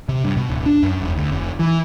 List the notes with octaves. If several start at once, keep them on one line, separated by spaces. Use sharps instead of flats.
C3
G2
B2
D1
D4
F#2
E1
D2
F1
E3